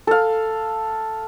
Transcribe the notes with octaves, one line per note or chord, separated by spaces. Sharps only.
A4 F5